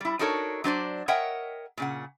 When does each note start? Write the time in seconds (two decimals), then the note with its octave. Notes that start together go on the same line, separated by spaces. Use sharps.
0.01 G3 E4
0.19 D4 D#4 F#4 A4 A#4 C#5
0.64 F#3 D4 C5 D5
1.08 A#4 C#5 D#5 E5 F#5 G5
1.77 A#2 C#3 F#5